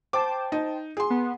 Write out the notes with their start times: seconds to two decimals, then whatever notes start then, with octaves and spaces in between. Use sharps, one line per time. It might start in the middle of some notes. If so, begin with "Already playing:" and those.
0.13 C5 G5 A5 D6
0.52 D#4
0.97 G#4 C6
1.10 B3